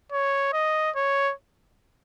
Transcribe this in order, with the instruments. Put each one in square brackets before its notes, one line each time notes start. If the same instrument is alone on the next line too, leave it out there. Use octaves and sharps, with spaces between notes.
[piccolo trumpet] C#5
D#5
C#5